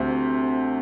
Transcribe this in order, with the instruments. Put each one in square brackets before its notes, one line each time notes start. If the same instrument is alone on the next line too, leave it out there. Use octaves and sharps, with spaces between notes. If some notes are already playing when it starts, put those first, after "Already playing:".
Already playing: [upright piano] D2 C3